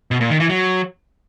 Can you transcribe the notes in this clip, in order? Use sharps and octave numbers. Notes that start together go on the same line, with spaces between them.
B2
A#2
D#3
E3
F#3